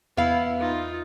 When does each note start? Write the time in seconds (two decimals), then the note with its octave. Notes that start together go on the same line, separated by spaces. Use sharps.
0.17 E2 B3 E4 F5
0.59 D#4 F4